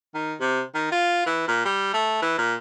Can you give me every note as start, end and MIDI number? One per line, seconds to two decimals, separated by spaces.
0.15 0.34 51
0.40 0.62 48
0.75 0.87 51
0.92 1.25 65
1.26 1.43 52
1.48 1.62 46
1.65 1.91 55
1.94 2.20 57
2.22 2.37 52
2.38 2.55 46